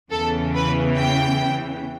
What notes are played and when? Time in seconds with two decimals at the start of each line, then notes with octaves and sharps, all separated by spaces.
0.11 E2 C#3 E3 B3 A4
0.54 B4
0.97 G5